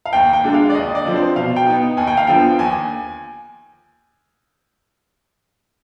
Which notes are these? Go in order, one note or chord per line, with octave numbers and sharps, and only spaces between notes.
F5
D#2 G5
G5
D3 G#3 D4
F5
D5
D#2 D#5
D5
D3 F3 C4
C5
B2 F5
G5
B3 D#4
D#2 G#5
G5
F5
D3 F3 B3 G5
D#2 G#5